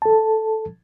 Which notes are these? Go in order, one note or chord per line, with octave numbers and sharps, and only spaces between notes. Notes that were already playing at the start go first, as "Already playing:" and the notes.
A4 A5